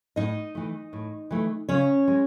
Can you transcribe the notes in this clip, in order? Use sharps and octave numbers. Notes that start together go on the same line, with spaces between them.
A2 D#4 D#5
E3 A3
A2
E3 A3
C#3 C#4 C#5
G#3